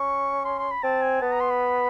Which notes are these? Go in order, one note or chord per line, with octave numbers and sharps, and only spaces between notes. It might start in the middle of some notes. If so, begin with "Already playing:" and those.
Already playing: C#4 C#6
C6
C6
B5
C4 A5
G#5
B3 A5
A#5
C6
B5